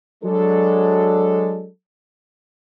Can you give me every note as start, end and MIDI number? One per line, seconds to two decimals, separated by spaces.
0.24 1.68 54
0.24 1.68 56
0.24 1.68 62
0.24 1.68 69